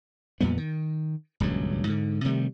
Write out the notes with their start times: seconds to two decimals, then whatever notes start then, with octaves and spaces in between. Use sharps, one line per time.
0.41 F2 A#2 G3 B3
0.58 D#3
1.40 D#1 C#2 G2 F#3
1.87 G#2 D3
2.25 C3 D#3 G3 A3